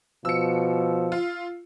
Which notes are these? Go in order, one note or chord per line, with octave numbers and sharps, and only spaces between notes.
B2 F3 E6 C#7
F4